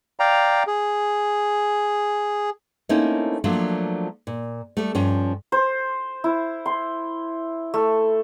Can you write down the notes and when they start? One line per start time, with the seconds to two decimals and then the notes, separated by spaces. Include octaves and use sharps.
0.20 D5 F5 G5 A#5
0.67 G#4
2.89 A3 A#3 C4 C#4 D#4 E4
3.44 F3 F#3 A3 A#3 D4 F#4
4.27 A#2
4.77 G3 A3
4.95 G2 F3 C#4
5.52 C5
6.24 E4
6.66 C6
7.74 A3